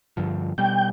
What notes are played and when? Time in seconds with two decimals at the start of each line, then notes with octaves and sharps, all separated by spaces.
0.17 G2 D3 F3
0.58 B2 G3 G5